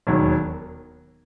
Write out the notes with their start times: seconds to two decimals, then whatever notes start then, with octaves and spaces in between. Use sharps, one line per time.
0.07 E1 D#2 D#3 F#3